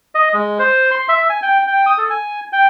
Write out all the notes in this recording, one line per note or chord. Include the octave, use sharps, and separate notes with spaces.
D#5
G#3
C5
C6
E5
G#5
G5
G5
D#6
A4
G#5
G5